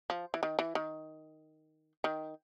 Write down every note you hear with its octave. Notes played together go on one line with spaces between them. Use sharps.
F3
E3
D#3
E3
D#3
D#3